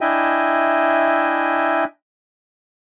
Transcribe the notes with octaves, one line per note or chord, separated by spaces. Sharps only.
D4 E4 D#5 E5 G5 G#5